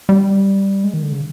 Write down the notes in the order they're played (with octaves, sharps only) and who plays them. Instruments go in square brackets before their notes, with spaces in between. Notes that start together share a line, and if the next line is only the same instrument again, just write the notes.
[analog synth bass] G3
G#3
D#3
D3
C#3